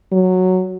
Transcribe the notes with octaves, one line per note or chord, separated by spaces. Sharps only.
F#3